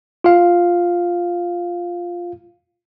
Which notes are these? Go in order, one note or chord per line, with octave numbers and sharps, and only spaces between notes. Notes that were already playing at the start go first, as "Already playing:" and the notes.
F4 F5